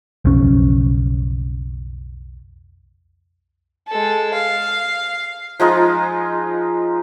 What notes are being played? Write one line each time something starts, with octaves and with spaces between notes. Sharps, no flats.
B1 F2 C#3 C#4
G#3 A4
F5
F3 G#3 D#4 F4